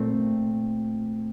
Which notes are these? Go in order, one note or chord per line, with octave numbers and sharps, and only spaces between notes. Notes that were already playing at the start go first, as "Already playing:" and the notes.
Already playing: A#2 A3 C4